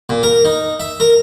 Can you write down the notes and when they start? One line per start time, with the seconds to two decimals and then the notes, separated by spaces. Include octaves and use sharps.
0.09 A#2
0.23 A#4
0.45 D#4
0.80 E5
1.00 A#4